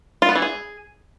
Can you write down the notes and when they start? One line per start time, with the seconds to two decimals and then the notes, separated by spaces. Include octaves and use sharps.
0.22 F4
0.29 B3
0.36 E3
0.42 G#4